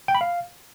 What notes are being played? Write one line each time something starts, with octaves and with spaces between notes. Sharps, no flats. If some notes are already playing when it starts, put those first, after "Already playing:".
G5
B5
F5